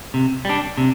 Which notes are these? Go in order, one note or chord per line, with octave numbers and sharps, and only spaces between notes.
C3
G3 D4
C3